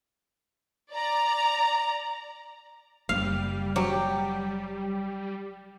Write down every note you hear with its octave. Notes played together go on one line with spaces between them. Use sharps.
D5 A#5
F#1 G3 F5
F#3 G4